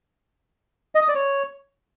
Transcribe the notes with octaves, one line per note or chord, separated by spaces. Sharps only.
D#5
D#6
D5
C#5